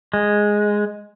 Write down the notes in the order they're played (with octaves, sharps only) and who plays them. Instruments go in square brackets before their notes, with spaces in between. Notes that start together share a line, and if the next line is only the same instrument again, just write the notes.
[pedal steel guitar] G#3